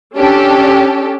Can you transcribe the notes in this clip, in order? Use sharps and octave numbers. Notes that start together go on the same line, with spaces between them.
C#4 D4 G4 A4